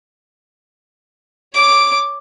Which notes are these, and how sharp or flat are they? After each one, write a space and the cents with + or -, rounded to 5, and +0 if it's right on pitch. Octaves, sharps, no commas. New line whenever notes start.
C#5 +10 D6 +0